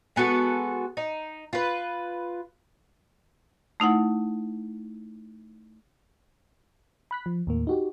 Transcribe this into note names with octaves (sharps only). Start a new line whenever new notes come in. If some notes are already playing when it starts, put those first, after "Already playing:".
G#3 B3 F#4 A4
D#4
F4 B4
A3 D#4 E4 F#5
B5 F#6 B6
F3
D#2 A2 A#3
D#4 F#4 G4